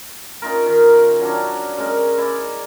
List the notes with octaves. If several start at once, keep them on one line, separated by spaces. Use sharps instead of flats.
C#4 D#4 F4 A#4
D#3
F#3 C#4 D4
C#3 G#3 A#4
E4 D5